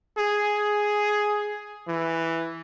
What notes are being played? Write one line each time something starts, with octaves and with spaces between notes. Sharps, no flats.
G#4
E3